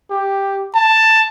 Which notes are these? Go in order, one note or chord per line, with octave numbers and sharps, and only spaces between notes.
G4
A5